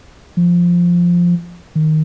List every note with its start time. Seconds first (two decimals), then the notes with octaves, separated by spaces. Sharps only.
0.37 F3
1.75 D#3